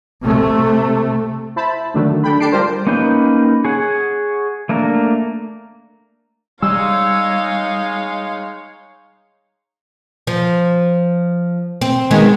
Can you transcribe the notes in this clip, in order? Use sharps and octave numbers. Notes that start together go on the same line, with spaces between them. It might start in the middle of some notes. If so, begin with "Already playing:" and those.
C3 A3
E4 C5 A5 B5
D3 D#3 F#3 A3 D4
D4 A4 G5 B5
D4 G4 A5 C7 D7
G3 D4 F4 G4 A#4 C5
A#3 C#4 D#4 B4 G5
G#4 C#5 F#5
A3 A#3 D4 A#4
G3 G#3 D#4 C#5 F5 E6
F3
C4
D#3 G#3 B3